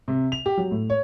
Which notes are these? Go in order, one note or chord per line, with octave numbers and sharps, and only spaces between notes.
C3
F7
G4
F#3
A2
C#5